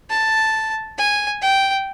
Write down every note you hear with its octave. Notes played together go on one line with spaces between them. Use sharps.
A5
G#5
G5